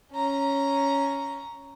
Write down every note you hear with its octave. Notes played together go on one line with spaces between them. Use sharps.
C#4 A#5